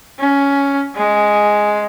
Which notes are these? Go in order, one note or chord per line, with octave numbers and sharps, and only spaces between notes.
C#4
G#3